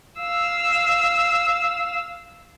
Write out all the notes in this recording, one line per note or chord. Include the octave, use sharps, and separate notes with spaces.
F5 E6